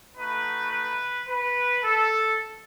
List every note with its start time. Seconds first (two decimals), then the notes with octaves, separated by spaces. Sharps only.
0.16 A3 D#4 F#4 B4
0.71 B4
1.29 B4
1.84 A4